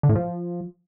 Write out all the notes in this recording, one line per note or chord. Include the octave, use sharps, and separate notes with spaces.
D3
A2
F3